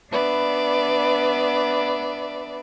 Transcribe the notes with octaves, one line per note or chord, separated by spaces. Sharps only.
B3 D4 B4 D5 E5